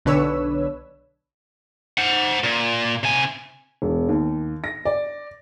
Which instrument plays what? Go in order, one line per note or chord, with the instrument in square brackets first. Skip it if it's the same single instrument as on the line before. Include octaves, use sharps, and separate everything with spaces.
[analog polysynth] B1 D3 D4 B4 C#5 E6
[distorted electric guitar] C5 F#5
A#2
C3 G#5
[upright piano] E1
D#2
A#6
D5